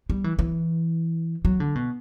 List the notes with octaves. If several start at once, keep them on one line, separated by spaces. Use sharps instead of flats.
G3
E3
E3
F#3
D3
B2